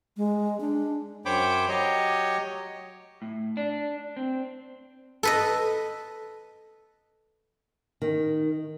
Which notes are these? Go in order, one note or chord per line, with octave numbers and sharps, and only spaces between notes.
G#3
D4
F#2 C5 C#5 G5 B5 D6
F#3 G4 C#5 D#5
A2
D4
C4
A4 B4 D#5
D#3